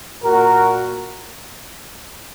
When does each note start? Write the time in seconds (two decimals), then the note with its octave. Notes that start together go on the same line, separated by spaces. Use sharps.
0.24 A#2 F#4 A#4